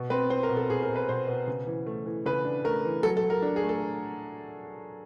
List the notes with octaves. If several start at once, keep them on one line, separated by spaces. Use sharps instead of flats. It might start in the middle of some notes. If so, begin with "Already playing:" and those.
Already playing: B2
C4 B4
C4 C5
A#4
B2
A4
B2 G#4
A#4
B2
B4
B2 C5
B2
C#3
E3
A3
E3
C#3 B4
D4
A3 A#4
E3
F#3 A4
A4
F#3
A#4
D4
G#4
A3
A4